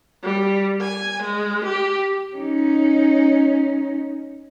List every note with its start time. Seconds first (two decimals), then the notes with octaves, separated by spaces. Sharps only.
0.24 G3
0.82 G#5
1.23 G#3
1.65 G4
2.36 C#4 D#4